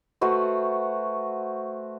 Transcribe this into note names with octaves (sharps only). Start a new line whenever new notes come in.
A3 F#4 B4 C5